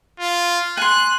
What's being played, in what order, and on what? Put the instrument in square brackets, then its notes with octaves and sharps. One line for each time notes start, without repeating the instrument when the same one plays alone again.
[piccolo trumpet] F4
[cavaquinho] G#5 C6 [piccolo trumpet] F#6